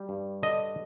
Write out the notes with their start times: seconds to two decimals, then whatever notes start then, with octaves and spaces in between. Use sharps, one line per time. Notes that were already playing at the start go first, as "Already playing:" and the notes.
Already playing: G3
0.09 G2
0.43 D3 D#5